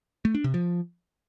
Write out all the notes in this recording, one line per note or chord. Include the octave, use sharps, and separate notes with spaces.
A3
D4
C3
F3